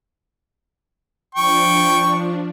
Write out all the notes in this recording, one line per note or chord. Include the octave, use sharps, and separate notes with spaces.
F3 D4 G5 C#6